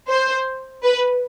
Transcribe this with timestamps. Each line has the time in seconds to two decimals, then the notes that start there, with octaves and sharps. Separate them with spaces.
0.10 C5
0.84 B4